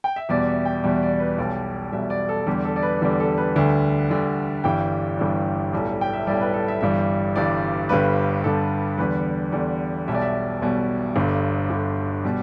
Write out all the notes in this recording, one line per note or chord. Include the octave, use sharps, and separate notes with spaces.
G5
E5
E2 B2 G3 D5
E5
G5
E2 B2 G3 E5
D5
B4
B1 B2 G3 D5
B1 B2 G3 E5
D5
A4
E2 D3 G3 G4
A4
D5
B4
E2 D3 G3 A4
A4
B4
D2 D3 G3
D2 D3 G3 D5
G1 G2 E3 G3 G5
G1 G2 E3 G3
B1 A2 G3
G5
E5
B1 A2 G3 D5
B4
A4
E5
G1 G2 E3 G3 E5
G1 G2 E3 G3 D5
G1 G2 D3 G3 B4
G1 G2 D3 G3 A4
E2 D3 G3 B4
E2 D3 G3 D5
B1 B2 G3 E5
D5
E5
B1 B2 G3
G1 G2 D3
G1 G2 D3
B2 G3